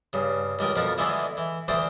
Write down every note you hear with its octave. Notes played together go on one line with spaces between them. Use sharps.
G2 C#3
C#2 G3 A#4 D#6
F2 B2 A#4 F5 F#5 A5
E2 D3 E3 G#3 B3 E4
E3
D2 E3 C5 D5 D#6